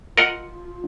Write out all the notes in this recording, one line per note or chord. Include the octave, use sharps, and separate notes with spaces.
F4 A#4 D#5 F#5